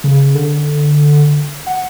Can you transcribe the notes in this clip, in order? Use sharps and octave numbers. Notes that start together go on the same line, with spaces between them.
C#3
D3
F#5